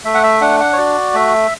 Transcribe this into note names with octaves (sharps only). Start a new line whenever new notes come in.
A3 E5
F#5
E5
D4 F#5
F#5
C#5
F#4 D5
A3 E5